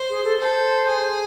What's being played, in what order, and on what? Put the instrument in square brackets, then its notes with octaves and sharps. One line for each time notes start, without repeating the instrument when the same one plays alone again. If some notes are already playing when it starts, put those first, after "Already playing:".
Already playing: [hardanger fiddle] C5
[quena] G#4
A4
[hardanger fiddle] A4 [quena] C5
[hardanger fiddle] G#4